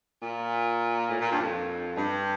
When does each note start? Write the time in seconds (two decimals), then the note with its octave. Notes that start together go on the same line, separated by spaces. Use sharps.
0.21 A#2
1.08 A2
1.19 A#2
1.30 G2
1.40 F2
1.96 G2